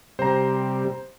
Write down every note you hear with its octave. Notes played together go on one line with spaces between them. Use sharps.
C3 G3 C5 A#5